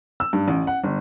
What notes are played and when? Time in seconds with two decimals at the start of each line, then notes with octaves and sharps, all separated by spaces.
0.20 E6
0.33 G2
0.48 A1
0.67 F#5
0.84 G1